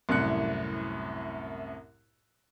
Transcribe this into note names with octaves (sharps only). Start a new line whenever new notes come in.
C2 F#2 A2 C3 F#6 C#7